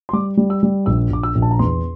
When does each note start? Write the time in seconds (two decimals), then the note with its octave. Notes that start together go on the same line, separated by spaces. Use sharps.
0.09 C6
0.13 G3 D6
0.37 G3
0.50 E6
0.63 G3
0.86 A#1 E6
1.10 A#1 D6
1.23 E6
1.35 A#1
1.42 A5
1.51 A#5
1.59 E2 C6